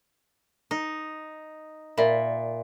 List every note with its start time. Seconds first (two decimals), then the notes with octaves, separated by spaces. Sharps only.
0.71 D#4
1.98 A#2 D5 E5 B5